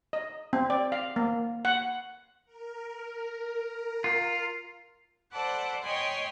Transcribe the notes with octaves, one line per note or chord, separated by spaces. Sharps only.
D#5
C4
D5
F5
A#3
F#5
A#4
F4
A4 C5 D5 F#5 A5 B5
C#5 D#5 G5 G#5 B5 C6